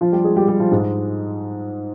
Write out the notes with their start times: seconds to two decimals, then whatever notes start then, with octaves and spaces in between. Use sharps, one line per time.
0.01 F3 F4
0.12 G3 G4
0.24 G#3 G#4
0.37 G3 G4
0.48 G3 G4
0.60 F3 F4
0.71 G#2 G#3